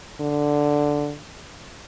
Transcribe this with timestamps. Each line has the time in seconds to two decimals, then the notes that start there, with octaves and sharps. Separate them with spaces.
0.21 D3